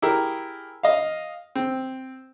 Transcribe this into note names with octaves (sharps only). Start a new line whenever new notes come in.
E4 G4 G#4 A#4
D#5 F5
C4